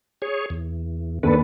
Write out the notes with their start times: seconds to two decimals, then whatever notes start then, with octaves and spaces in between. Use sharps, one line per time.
0.22 G#4 C#5
0.50 E2
1.23 D#2 D4 A4 B4 B5